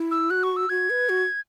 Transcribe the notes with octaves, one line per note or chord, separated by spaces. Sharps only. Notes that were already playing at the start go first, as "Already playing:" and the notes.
Already playing: E4
E6
F#4 F#6
C#6
E6
F#4 G#6
B4
F#4